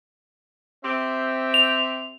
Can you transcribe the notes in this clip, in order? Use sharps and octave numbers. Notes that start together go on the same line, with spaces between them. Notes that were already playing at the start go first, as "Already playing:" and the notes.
C4 G4 E5
F7